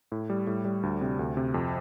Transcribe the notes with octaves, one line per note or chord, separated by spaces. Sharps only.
A2
G3
A2
G3
D2
C3
D2
C3
F2